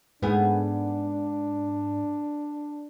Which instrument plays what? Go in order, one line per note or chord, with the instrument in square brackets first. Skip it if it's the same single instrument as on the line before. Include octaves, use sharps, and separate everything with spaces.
[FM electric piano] G#2 [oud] B3 G#4 [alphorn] D4